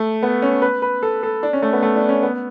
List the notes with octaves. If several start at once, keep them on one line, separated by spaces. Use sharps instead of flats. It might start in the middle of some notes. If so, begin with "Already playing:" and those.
Already playing: A3
B3
C#4
B4
B4
A4
A4
D4
C#4
A3
B3
A3
D4
C#4
B3